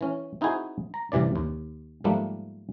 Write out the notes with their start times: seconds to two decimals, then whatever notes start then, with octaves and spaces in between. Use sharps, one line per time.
0.01 E3 C#4
0.41 C4 D#4 E4 F#4 G#4 C5
0.94 A#5
1.12 A1 G2 C3 E3 D5
1.36 D#2
2.04 G#2 F3 G3 A3 A#3